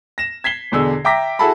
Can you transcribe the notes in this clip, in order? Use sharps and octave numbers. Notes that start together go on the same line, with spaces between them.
A#6 E7
G#6 B6 C7 G7
E2 B2 D3 G#4 E6
E5 G5 A#5 D6 A#6 B6
E4 F#4 G#4 A4 A5 B5